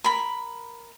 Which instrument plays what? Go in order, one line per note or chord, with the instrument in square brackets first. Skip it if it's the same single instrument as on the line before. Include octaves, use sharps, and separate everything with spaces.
[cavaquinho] A#4 B5